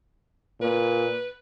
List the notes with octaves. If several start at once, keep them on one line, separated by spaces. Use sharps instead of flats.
A#2 B4